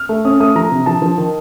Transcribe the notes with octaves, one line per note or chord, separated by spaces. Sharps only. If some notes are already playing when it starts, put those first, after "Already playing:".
Already playing: F6
A3
C#4 D#6
A3 D#6
F3 A#5
C3
F3 A5
F3
D#3